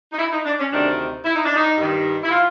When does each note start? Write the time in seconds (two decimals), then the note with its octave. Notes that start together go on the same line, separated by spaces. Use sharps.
0.13 D#4
0.19 E4
0.32 D#4
0.45 D4
0.59 C#4
0.72 D2 C3 D#3 D4
1.25 E4
1.35 D#4
1.46 D4
1.56 D#4
1.78 G2 D#3
2.24 E4
2.31 F4